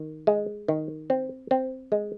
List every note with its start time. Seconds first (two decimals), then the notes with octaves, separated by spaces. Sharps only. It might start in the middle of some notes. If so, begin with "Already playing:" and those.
Already playing: D#3
0.27 G#3
0.68 D#3
1.10 C4
1.51 C4
1.92 G#3